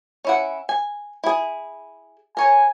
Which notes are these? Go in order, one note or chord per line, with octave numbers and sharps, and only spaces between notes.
C#4 E4 F#5
G#5
E4 G#4
A#4 C#5 G#5